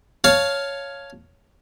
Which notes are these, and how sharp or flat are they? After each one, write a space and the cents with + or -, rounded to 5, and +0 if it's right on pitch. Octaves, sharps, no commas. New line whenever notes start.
C#5 +5 F5 +0 A5 +0